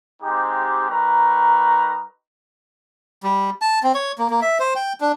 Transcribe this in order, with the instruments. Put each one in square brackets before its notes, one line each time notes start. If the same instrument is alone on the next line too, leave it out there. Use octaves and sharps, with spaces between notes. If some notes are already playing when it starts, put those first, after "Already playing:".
[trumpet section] G#3 C4 D#4 G4
G3 D#4 A#4 B4 A#5 C#6
[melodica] G3
A5
C4
C#5
A#3
A#3
E5
C5
G5
D4